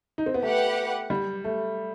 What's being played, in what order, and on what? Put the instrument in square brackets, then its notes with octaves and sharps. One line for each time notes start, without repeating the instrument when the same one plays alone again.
[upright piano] D#4
C4
B3
[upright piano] A3 [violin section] G4 B4 F#5
[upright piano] G3
A3